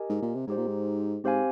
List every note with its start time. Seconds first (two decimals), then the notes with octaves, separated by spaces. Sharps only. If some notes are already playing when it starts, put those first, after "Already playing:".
Already playing: G4 A#4 D#5 G#5
0.10 G#2
0.22 A#2
0.35 C3
0.47 G#2 D#4 G4 C5
0.57 A#2
0.67 G#2
1.24 G#2 C4 G4 C5 F5 G#5